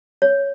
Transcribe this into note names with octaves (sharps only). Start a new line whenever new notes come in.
C#5